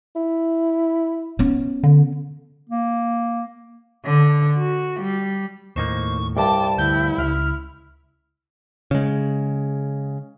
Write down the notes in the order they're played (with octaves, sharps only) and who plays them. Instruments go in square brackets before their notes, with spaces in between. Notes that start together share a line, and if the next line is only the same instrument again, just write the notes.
[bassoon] E4
[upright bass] B3 C#4
[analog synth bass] D3
[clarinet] A#3
[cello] D3
F#4
G3
[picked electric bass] D#2 A2 [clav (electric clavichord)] A#3 D#4 C5 [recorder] C#6
[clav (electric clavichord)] C2 G2 [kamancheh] G5 A5 [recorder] D6
[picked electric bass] D2 [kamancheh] E4 [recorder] G6
[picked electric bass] C#2 [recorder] F6
[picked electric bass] C#3 G#3